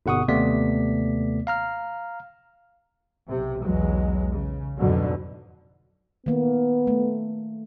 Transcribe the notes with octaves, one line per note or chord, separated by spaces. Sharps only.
G1 B2 F#5 C#6 D#6
D#2 C3 A3 B3 D5 B6
F5 A#5 F6
B1 C3
B1 E2 F#3 G#3
C#3
F2 G#2 B2 D3 F#3
D#3 A#3 B3
A3